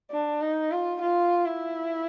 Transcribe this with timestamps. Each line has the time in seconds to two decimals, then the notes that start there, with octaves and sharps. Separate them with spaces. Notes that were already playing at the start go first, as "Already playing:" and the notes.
0.11 D4
0.41 D#4
0.71 F4
1.01 F4
1.46 E4